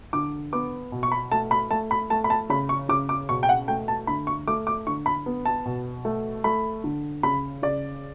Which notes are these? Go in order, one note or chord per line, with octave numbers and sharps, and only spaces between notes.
D3 D6
B3 D6
B2
C#6
B5
A3 A5
B5
A3 A5
B5
A3 A5
B5
A5
C#3 B5
C#6
C#3 D6
D6
B2 C#6
G5
F#5
A3 G5
A5
D3 B5
C#6
A3 D6
D6
D3 C#6
B5
B3
A5
B2
A3
A3 B5
D3
C#3 B5
C#3 D5